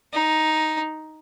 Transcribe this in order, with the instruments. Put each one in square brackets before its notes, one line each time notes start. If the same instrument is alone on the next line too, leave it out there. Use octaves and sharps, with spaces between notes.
[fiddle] D#4